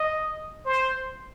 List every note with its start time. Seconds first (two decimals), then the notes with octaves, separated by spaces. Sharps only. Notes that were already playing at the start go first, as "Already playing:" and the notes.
Already playing: D#5
0.65 C5